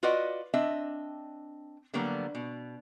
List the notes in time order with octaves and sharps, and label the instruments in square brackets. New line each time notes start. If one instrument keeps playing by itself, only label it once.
[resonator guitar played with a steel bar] F4 F#4 B4 D5 D#5 F#5
C4 D4 D#5 E5
D3 F#3 G3 A#3 B3
B2